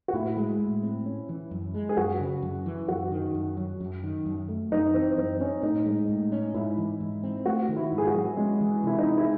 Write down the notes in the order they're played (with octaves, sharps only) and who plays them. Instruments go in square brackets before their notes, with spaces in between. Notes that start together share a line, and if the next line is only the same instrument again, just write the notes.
[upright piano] F#4
[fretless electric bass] A2 [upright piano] E4
[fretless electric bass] G#3
A2
C4
C#4
E3
F#2
G#3
[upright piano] G#4
[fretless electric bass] F#2 [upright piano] F#4
[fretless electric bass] C#3
F#2
E3
[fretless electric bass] F#2 [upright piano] F#4
[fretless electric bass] D#3
F#2
F#3
F#2
D#3
F#2
A3
[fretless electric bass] F#2 [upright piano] D#4
[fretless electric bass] E3 [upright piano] C4
[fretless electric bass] F#2 [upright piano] C4
[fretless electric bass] C4 [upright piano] C#4
[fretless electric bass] A2 [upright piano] D#4
[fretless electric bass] G#3
A2
C#4
[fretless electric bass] G#2 [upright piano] E4
[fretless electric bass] E3
G#2
C4
[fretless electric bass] A3 [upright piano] F#4
[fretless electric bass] D#3
[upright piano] E4
[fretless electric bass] G#2
[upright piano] G#4
F#4
[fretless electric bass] F#3
[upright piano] G#3 [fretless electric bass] C#4
[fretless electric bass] E3
[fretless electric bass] C3 [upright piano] E4
[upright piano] D#4
[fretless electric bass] G#3
[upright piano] E4